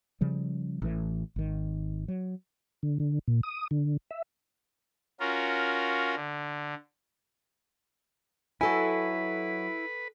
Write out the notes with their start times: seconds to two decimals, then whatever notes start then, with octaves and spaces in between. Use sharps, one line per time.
0.21 C#3 F3 G3
0.82 A1 A2 E3
1.36 G#1 D#3
2.08 F#3
2.83 D3
3.00 D3
3.28 A#2
3.43 D#6
3.71 D3
4.11 E5
5.20 C#4 F4 F#4 A#4
6.15 D3
8.61 F#3 E4 F#4 A4 B4 G#5